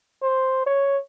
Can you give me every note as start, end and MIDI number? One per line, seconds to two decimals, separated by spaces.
0.22 0.63 72
0.66 0.97 73